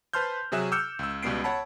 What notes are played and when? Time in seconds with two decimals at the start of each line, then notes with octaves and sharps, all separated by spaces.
0.13 B4 C5 A5 C6 F6 G6
0.52 C3 F#3 G#4 E5 F#6 E7
0.72 D6 E6 F6 G6 C#7
0.99 C#2 E6
1.23 C#2 B2 G3 B3 C7 D7
1.44 C#5 F#5 A5 B5